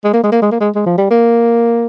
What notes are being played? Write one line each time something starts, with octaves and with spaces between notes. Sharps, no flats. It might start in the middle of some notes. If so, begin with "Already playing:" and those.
G#3
A#3
G#3
A#3
G#3
A#3
G#3
G#3
F3
G3
A#3